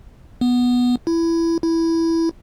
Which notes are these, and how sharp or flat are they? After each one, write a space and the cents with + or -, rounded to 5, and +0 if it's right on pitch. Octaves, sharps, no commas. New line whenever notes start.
B3 -5
E4 +15
E4 +0